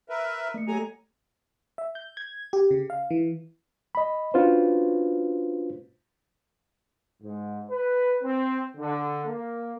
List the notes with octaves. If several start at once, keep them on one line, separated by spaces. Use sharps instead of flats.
A#4 B4 E5
A3 A#3 C#7
F#3 G4 A4 G#5 A#5
E5
G6
G#6
G4
C#3
F5
E3
D#5 B5
C#4 D4 F4 F#4 B4 C5
G#2
B4
C4
D3
A#3